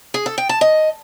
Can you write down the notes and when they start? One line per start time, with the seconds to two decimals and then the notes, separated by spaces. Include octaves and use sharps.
0.14 G#4
0.26 A4
0.38 G5
0.49 A5
0.61 D#5